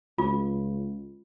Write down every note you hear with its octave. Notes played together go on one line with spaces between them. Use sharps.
C#2 F4